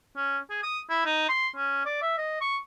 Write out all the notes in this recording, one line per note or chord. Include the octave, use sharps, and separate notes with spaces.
C#4
G#4
D#6
E4
D#4
C6
C#4
D5
E5
D#5
C#6